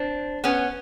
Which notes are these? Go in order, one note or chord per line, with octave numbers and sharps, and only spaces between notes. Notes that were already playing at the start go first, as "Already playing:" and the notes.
Already playing: C4 D4
B3 C#4